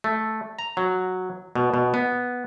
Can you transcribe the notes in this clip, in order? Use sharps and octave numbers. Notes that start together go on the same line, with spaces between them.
A3
A#5
F#3
B2
B2
B3